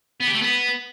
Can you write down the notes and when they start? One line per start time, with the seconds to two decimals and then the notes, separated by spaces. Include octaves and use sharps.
0.20 B3
0.27 G4
0.34 A3
0.41 B3